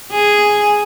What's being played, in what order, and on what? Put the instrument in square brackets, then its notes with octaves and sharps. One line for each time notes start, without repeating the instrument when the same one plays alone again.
[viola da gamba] G#4